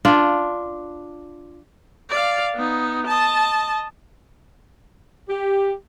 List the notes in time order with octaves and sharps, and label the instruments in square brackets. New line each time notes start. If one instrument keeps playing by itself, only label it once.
[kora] D4 F4
[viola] D5 F5
B3 D#4
D#5 A5
[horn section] G4